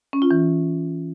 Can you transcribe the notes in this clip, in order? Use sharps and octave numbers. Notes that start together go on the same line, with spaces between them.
C#4
F4
E3